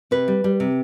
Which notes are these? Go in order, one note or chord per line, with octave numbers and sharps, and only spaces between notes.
C3 B4
G3
G3
C3